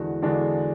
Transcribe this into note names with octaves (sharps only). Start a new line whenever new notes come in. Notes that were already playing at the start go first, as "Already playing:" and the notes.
Already playing: E2 D3 G#3 D4 F#4
E2 D3 G#3 D4 F#4